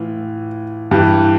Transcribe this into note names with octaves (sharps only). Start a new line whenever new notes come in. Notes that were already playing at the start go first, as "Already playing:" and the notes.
Already playing: A2 E3 F4
G2 E3 G4